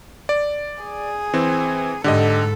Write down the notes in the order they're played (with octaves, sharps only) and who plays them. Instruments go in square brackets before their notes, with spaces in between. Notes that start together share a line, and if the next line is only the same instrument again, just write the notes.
[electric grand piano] D5
[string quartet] G#4
[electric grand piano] E3 C4
[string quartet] G#2 A4 [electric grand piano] D3 G4 D#5